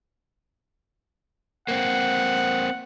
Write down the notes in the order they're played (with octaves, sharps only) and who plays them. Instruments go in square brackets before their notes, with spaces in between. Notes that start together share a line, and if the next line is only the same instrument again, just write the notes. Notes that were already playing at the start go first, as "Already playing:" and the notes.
[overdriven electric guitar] A#3 C4 [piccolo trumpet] F#5